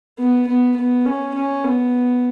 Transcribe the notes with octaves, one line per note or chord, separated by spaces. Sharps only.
B3
B3
B3
C#4
C#4
B3